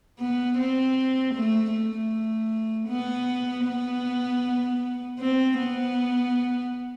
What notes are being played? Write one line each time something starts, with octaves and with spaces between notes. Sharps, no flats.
B3
C4
A3
A3
B3
B3
C4
B3